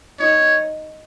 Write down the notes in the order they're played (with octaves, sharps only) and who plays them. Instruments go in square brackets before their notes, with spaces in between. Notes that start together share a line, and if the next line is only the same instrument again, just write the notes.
[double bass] D#4 [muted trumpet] C#5